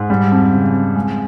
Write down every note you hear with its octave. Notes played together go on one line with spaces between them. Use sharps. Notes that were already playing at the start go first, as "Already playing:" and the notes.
Already playing: G#2
G3
F2
C#3
F2
G#3